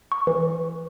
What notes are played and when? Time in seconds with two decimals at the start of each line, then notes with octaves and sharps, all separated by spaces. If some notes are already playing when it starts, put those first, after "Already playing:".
0.12 C#6
0.27 E3